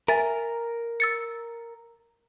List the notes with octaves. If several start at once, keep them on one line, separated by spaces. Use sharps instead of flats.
A#4 E5 G#5 A6
E6 A6 C#7